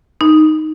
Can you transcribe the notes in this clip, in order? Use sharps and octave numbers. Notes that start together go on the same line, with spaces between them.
D#4